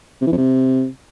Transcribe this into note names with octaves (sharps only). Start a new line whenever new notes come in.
C3
E3
F2
C3